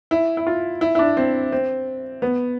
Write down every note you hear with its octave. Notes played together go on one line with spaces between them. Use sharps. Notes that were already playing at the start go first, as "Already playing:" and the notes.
E4
E4
F4
E4
E4
D4
C4
C4
B3